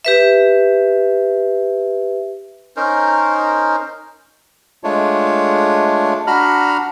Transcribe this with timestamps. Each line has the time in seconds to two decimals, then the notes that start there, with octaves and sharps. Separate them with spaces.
0.05 G4 B4 E5
2.77 C#4 D#4 A#4 C5
4.84 G#3 A3 D4 F4 C#5
6.27 D4 F#4 A#5 B5 F6